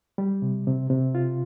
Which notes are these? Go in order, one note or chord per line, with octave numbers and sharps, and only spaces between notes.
G3
C3
C3
C3
F4